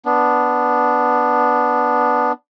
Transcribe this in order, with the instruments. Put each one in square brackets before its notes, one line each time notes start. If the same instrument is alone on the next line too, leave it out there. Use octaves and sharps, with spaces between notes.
[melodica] B3 D4